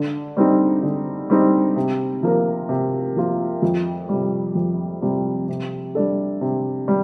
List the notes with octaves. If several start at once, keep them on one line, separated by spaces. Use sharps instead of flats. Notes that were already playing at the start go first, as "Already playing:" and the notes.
Already playing: D3
G3 C4 D#4
D3
G3 C4 D#4
C3
F3 A#3 F4 A#4
C3
F3 A#3 F4 A#4
F2
C3 G3
F2
C3 G3
C3
G3 D4 A4
C3
G3